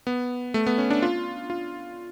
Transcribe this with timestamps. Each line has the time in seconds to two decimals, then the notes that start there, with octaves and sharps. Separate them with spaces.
0.07 B3
0.54 A3
0.67 B3
0.78 C#4
0.90 D4
1.02 F4
1.50 F4